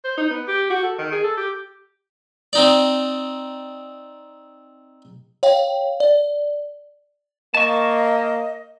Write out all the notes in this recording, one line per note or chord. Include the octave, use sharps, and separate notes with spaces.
C5
D#4
B3
G4
F#4
A4
D#3
G#4
A4
G4
C4 D#4 D5
C#5 F5 G5
D5
A#3 D#5 A5 C#6